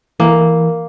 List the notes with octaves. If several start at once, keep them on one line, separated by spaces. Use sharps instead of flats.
E3 A#3 A#4